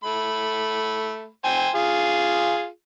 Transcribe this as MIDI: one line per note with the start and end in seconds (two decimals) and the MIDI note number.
0.04 1.28 57
0.04 1.28 83
1.44 1.69 72
1.44 1.69 79
1.44 1.69 80
1.75 2.67 65
1.75 2.67 68